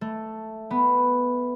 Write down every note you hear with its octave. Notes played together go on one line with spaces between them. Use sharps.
A3
B3